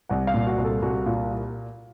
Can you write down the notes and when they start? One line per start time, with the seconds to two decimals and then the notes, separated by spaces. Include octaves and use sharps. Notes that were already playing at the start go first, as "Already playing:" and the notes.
0.09 C2 F#5
0.27 F5
0.34 A#2
0.47 F#4
0.58 C2
0.64 A4
0.82 C2 F#4
1.06 A#2 F4